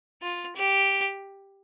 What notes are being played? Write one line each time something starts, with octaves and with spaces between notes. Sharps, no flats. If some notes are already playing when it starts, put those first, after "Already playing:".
F4
G4